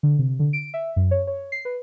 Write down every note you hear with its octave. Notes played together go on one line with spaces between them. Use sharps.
D3
C3
D3
D7
E5
F#2
C#5
C#5
C7
B4